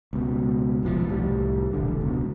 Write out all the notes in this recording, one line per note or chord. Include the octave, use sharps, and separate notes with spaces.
C#2 B2
D#1 B1 C#3 F3
C2 A2 F3 G3
E1 A#1 D3
C#2 B2